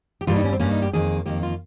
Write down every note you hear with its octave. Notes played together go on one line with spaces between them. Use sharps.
G4
G2 G3 A#3 F4
D#4
C#4
C4
G2 G3 A#3 C#4
D#4
G4
F2 D#3 A#3 G#4
F2 D#3 A#3 G4
F4